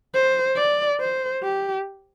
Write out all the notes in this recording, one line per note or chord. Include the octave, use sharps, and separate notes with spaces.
C5
D5
C5
G4